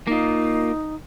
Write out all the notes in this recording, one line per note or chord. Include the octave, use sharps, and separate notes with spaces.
A#3 D#4 F4